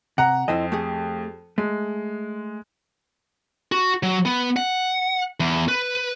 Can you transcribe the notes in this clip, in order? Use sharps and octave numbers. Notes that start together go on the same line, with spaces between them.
C3 F#5 A#5
F2 E4 C5 D#5
A3 G4 G#4
G#3 A3
F#4
F#3
B3
F#5
E2
B4